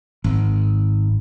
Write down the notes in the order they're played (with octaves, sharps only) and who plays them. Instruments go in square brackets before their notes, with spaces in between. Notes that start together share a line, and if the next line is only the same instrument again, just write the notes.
[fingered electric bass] G#1